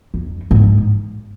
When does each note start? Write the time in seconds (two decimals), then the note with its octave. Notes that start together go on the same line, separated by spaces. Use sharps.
0.14 F2
0.51 G#2